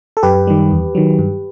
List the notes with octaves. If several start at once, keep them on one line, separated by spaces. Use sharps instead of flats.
A4
F#2 G4 B4
D#3 G3
E2
D#3 F#3
G2